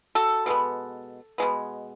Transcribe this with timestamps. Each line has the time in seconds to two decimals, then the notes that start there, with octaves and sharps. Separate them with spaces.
0.15 F#4 A4
0.46 B2 G#3 B3
1.38 B2 G#3 B3